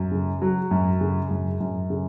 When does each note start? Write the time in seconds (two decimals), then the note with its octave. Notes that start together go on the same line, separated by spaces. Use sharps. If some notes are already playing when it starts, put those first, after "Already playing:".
Already playing: F#2
0.11 C#3
0.42 F#3
0.71 F#2
1.01 C#3
1.30 F#2
1.60 F#2
1.90 C#3